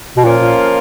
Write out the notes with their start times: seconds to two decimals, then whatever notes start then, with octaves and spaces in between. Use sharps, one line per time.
0.17 B2
0.24 A#2 F3 A#3 C#4 F4 A#4
0.41 A#2